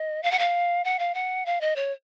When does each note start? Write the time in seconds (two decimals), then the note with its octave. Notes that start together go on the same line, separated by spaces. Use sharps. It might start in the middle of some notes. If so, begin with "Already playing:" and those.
Already playing: D#5
0.23 F5
0.31 F#5
0.39 F5
0.84 F#5
0.99 F5
1.15 F#5
1.46 F5
1.61 D#5
1.76 C#5